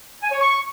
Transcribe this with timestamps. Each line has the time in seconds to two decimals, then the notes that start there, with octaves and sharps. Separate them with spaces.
0.23 G#5
0.31 C#5
0.40 C#6